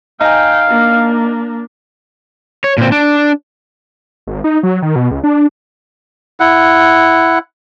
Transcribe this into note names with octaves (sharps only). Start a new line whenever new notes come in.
D#4 F5 G5 G#5
A#3 D4
C#5
A#2 C4
D4
G#1
D#4
F#3
D#3
B2
C#2
D4
E4 F#5